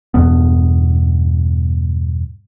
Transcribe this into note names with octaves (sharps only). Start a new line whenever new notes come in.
E2 G2 B2 B3